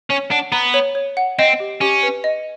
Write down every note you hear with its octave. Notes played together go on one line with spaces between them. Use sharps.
C#4 C#5
D4 F#5
B3 A#5
C#5
C#5
F#5
C4 D#5
G4
C#4 G4
B4
D#5